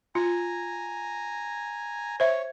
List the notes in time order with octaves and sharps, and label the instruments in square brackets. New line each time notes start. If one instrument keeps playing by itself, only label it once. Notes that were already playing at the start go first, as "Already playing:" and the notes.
[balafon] F4 [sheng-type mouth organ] G#5 A#5
[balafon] C5 E5 [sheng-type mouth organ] C#5